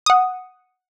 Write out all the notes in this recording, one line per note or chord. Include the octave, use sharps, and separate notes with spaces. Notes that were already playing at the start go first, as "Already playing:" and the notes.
F#5 D#6